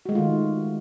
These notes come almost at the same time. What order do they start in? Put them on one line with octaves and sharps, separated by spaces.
F#4 G#3 A3 F4 D#3